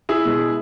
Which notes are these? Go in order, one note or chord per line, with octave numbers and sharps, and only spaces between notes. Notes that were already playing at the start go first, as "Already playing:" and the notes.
E4 G#4
B2 G#3